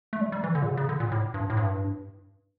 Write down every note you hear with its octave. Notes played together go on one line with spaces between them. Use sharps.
A3
G3
G3
E3
D3
A#2
C#3
C#3
D3
A#2
A2
G2
A2
G2